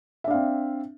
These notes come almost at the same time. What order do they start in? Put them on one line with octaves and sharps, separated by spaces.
E5 D4 F5 C4